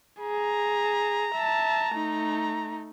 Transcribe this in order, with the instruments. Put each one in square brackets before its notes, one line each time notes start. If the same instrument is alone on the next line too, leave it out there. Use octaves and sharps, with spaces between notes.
[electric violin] G#4 [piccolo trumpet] A#5
[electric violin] E5 A5
A3 D#4